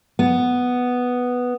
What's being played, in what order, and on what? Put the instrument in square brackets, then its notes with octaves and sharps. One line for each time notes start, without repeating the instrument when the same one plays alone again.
[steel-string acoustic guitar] B3